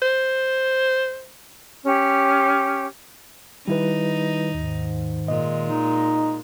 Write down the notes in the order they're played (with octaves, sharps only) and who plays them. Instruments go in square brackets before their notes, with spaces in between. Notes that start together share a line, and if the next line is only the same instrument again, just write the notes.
[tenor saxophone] C5
[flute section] C#4 G4
[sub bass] D#3 [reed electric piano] G3 E4 B4 [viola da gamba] D#4
[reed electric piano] D#2 [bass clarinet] G#2
[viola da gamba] A#2 G#3 [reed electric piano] D#5
[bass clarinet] D#4